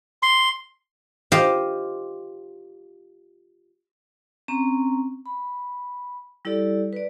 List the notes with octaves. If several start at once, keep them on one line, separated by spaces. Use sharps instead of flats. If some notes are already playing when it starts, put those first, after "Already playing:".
C6
F4 G4 C5 D#5
C4 C#4 A#5
B5
G3 E4 G4 A4 D5
B4 D5